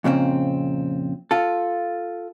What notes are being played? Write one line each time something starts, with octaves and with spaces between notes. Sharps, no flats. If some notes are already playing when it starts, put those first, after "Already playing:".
F2 A#2 C#3 C4
F4 A4